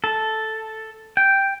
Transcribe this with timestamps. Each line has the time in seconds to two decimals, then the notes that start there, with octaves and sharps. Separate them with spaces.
0.04 A4
1.17 G5